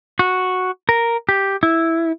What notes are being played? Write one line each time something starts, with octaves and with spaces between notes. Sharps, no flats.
F#4
A#4
G4
E4